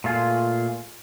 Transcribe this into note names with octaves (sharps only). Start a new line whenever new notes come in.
A#2 A3 F4 G#4